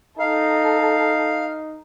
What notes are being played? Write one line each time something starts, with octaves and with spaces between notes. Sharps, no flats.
D#4 A4 F5